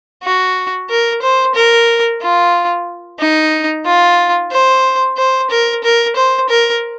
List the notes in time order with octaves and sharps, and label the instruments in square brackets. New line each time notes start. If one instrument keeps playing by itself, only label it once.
[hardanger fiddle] F#4
A#4
C5
A#4
F4
D#4
F4
C5
C5
A#4
A#4
C5
A#4